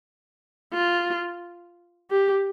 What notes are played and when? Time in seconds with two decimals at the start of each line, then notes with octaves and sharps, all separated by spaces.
0.73 F4
2.10 G4